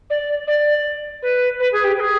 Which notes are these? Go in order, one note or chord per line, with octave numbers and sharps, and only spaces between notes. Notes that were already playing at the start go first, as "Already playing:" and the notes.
D5
D5
B4
B4
G#4
G4
B4
G#4